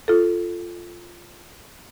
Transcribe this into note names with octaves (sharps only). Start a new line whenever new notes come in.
F4 A4